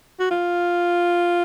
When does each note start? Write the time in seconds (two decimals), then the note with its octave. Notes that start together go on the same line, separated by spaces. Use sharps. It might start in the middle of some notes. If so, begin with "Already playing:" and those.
0.20 F#4
0.31 F4